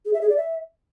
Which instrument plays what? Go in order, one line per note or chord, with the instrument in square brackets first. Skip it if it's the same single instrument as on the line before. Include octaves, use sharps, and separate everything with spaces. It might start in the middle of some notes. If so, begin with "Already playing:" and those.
[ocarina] G#4
E5
G#4
D5
E5